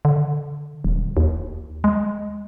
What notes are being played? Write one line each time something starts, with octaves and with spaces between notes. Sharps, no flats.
D3
D#1
D#2
G#3